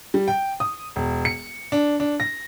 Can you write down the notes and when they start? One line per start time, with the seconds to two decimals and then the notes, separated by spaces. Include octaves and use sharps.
0.14 G3
0.28 G5
0.60 D#6
0.96 E1
1.25 C#7
1.72 D4
2.00 D4
2.20 A#6